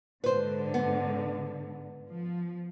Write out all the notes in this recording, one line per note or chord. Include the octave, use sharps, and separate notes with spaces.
G#2 D3 B4 C5
B3
F3